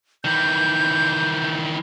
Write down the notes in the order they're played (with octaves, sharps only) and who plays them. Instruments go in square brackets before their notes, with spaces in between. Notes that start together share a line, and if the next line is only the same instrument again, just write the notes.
[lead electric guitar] D#3 E3 [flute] G6